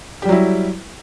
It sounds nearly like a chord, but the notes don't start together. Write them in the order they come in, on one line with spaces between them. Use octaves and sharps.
G4 G3 F#3 E4